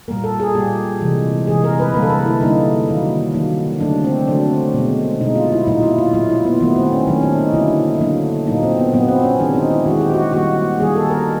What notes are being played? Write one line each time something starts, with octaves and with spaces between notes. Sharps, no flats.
A#2 G3 A#3 A#4
A4
G#4
A#2 G3 A#3 G4
C3 E3 G#3
C3 E3 G#3 G#4
A#4
B4
D3 G3 A#3 B4
A4
A#4
E4
D3 G3 A#3 D#4
D#3 F#3 A#3
D#3 F#3 A#3
D3 F#3 A3 D4
C4
D3 F#3 A3 D4
B2 G#3
B2 G#3 D#4
F4
E4
A#2 F#3 A#3 D#4
E4
F4
A#2 F#3 A#3 F4
E4
B3
D#3 F#3 A3 B3
C4
C#4
D#3 F#3 A3 C#4
D4
D#4
D3 F#3 A#3 E4
D3 F#3 A#3
A#2 F#3 A#3 D#4
C4
B3
A#2 F#3 A#3 B3
C4
C#4
D#3 G#3 D4
D#4
E4
D#3 G#3 F#4
G4
F#4
D#3 G3 A#3 F#4
D#3 G3 A#3 G#4
A4
A#4